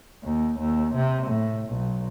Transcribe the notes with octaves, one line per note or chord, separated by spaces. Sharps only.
D#2
D#2
C3
A2
B1